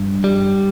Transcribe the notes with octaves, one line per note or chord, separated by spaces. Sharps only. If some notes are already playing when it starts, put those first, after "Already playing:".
Already playing: G2
G3